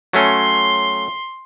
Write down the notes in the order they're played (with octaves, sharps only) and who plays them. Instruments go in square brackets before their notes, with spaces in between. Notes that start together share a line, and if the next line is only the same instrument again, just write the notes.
[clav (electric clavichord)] F#3 A3 C#4 [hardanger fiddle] C6